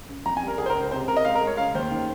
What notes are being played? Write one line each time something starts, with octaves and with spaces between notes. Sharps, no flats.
C#3
F2 A#5
G#5
G3
A#4
C#2 G#4
C5
A#4
C#2
C5
C3 C5
C3 A#4
D#5
G#3 F5
A#4
G#3
C#5
C#3 F5
D#2 C5
D#3